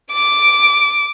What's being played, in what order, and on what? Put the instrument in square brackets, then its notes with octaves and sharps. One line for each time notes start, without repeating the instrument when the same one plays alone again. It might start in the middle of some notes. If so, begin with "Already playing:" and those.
[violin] D6 D7